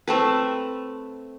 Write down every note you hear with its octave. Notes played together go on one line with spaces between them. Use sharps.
A3 C4 B4